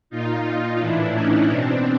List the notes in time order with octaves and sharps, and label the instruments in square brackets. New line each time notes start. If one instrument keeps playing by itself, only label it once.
[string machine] A#2 D#4 F4
A2 E3 D4 E4
C#4 D#4
B2 C4 D4